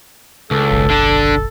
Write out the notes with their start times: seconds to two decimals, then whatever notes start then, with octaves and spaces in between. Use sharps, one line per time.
0.51 C#2 A4
0.71 F#1 B1
0.90 D3 D4